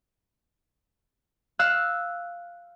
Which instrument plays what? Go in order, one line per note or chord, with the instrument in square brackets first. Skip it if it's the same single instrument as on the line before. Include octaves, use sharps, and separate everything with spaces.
[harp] F5 E6 F#6